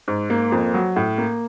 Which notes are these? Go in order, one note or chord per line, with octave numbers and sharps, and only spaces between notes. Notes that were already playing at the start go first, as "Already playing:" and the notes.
G#2
A#3
F2
F#3
A2
A#3